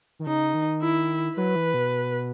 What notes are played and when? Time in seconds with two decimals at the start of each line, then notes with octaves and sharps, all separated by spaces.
0.19 D#3
0.26 C#3 D#4
0.54 D#3
0.82 E4
1.37 F#3 B4
1.56 E3
1.74 B2